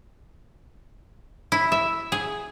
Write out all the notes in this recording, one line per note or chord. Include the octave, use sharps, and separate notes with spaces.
E4
E5
G#4